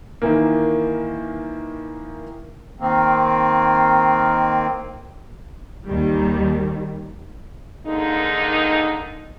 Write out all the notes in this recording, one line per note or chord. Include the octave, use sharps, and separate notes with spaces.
D#3 E3 A#3
D#3 A#3 C4
D#2 D#3 G3
D3 D#3 G#3 A#3 D#4